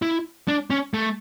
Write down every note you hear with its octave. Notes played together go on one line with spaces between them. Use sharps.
E4
D4
C#4
A3